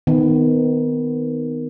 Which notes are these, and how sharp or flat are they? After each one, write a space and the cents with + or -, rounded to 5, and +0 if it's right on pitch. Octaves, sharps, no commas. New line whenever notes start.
D#3 +0 B3 +25